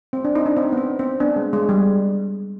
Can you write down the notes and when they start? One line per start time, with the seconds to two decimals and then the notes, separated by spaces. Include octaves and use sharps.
0.13 C4
0.25 D4
0.35 C4 D#4
0.46 D4
0.57 C4 D#4
0.72 B3
0.78 C4
0.99 C4
1.20 B3 D4
1.36 G#3
1.53 G#3
1.69 G3